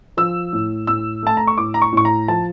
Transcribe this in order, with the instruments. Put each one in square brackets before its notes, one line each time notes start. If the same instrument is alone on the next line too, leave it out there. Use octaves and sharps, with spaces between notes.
[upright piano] F3 E6
A2
A2 E6
A3 A5
A#5
C#6
A2 D6
A#5
C#6
A2 C#6
A#5
F3 A5